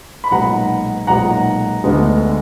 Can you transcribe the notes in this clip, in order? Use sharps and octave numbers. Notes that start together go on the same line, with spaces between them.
B5
B1 A#2 G#3 B3 F#5 A#5
B1 A#2 G#3 B3 F#5 A#5
D2 D3 G#3 B3